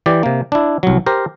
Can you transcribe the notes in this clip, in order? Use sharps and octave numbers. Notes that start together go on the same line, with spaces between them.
E3 G4 D5
C3 A#3
D4 E4
C2 F#3
G4 A#4 C5